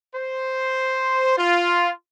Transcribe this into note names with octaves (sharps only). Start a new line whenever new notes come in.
C5
F4